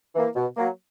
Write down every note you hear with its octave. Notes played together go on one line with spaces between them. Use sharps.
E3 A#3
B2
F#3 A#3